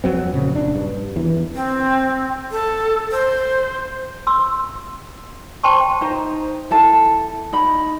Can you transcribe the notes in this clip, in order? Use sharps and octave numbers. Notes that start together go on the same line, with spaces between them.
F2 F#3 C4
A#2 C#3
F#1 D4
G2
E2 E3
C4
A4
C5
C6 E6
C5 G5 A5 C6 C#6
D#4 C5 A#5
E4 A4 A5
D#4 B5